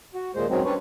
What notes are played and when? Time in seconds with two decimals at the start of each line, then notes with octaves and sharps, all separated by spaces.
0.14 F#4
0.35 D#2 A#2 G#3 C5
0.50 F#2 D#3 F#3 G#3 C4
0.65 G3 C#4 D4 B4 C#5